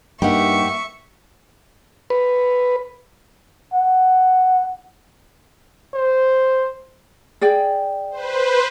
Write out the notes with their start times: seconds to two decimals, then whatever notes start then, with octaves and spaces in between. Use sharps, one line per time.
0.22 G2 A#3 D#4 G4 E5 F#5 C#6
2.10 B4
3.73 F#5
5.95 C5
7.41 G#4 D5 G5
8.11 B4 C5